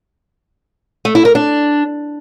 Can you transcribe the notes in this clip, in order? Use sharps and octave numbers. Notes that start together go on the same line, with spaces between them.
A3
E4
A#4
D4